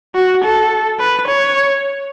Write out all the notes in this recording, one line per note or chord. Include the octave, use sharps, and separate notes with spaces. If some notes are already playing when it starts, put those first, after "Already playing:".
F#4
A4
B4
C#5